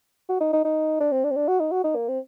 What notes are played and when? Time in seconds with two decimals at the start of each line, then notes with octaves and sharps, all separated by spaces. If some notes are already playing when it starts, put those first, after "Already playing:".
0.29 F#4
0.40 D#4
0.53 D#4
0.65 D#4
1.00 D4
1.12 C4
1.24 D4
1.31 C4
1.36 D4
1.48 F#4
1.60 D#4
1.72 F#4
1.84 D#4
1.95 A#3
2.08 C4